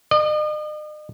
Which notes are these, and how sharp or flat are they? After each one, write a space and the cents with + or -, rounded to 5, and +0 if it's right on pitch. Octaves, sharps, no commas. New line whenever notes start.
D#5 -40